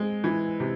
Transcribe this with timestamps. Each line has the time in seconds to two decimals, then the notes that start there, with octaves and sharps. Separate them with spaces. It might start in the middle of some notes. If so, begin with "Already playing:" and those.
Already playing: G#3 C4
0.24 E3
0.60 C3